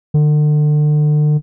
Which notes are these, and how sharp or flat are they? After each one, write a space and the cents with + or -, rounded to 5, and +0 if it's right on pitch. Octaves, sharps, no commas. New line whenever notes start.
D3 +35